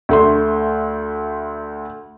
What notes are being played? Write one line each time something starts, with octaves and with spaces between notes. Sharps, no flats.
D2 A3 C6